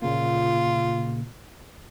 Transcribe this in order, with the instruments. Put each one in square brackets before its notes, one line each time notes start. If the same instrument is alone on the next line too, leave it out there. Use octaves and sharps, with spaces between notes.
[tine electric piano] A#2 C#3 A#3 [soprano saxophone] F4